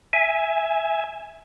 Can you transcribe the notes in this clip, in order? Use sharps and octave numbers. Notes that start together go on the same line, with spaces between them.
E5 G#5